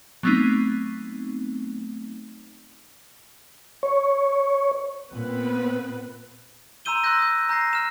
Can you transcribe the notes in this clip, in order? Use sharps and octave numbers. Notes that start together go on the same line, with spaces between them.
F#3 G#3 A3 B3 C4 D#4
C#5
A#2 B3 C4 B4
A#5 C6 E6 G6 D#7 G7
C6 E6 F#6 G6 A#6
D#6 G6
A#5 G6 A#6 C7
F6 E7